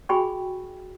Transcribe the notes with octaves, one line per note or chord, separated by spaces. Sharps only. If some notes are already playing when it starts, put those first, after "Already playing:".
F#4 G#4 G5 G#5 B5 C#6